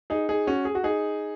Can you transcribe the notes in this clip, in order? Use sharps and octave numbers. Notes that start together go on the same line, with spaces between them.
D#4 G#4
D#4 G#4
C#4 F#4
G#4
F#4
D#4 G#4